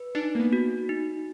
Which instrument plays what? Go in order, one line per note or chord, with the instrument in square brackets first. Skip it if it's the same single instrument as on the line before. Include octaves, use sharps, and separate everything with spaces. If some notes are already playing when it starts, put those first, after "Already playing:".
Already playing: [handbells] B4
[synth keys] D4 [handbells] D#4
[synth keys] A#3
B3
[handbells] F#4
D#4